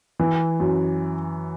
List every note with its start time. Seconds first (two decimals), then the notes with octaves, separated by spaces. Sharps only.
0.19 E3
0.60 F#2